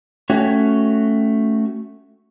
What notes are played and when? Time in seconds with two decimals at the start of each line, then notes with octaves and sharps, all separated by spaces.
0.30 A3 C#4 F#4 C#5 G5